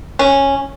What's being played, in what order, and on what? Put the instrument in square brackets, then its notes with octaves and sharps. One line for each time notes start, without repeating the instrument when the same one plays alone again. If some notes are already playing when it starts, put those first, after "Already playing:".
[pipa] C#4